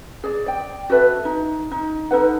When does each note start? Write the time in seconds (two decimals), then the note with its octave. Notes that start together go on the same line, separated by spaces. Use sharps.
0.24 G#4 D5
0.46 D5 G5
0.90 F#4 A4 B4 E5
1.25 D#4
1.72 D#4
2.11 D#4 A4 B4 F#5